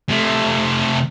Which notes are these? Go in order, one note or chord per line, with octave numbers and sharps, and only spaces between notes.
C3 A3